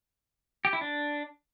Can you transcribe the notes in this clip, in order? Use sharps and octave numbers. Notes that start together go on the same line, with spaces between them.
G4
E4
D4